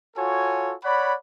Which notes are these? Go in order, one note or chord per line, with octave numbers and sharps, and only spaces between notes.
F4 F#4 A4 C#5 G#5
C#5 D5 F#5 B5